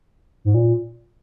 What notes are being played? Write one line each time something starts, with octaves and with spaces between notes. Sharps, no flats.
G#2
A#2